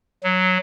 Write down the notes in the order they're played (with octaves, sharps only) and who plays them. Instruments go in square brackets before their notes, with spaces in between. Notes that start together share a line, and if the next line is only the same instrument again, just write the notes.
[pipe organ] F#3